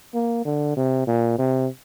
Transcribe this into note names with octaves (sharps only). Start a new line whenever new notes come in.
A#3
D3
C3
A#2
C3